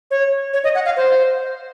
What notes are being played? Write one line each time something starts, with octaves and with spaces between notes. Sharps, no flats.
C#5
C#5
D#5
F#5
F5
C5